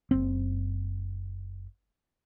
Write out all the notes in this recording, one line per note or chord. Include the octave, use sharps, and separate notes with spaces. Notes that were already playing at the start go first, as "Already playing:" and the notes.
F#1 C4